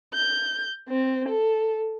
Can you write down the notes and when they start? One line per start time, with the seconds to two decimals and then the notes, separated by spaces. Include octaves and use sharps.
0.14 G6
0.89 C4
1.29 A4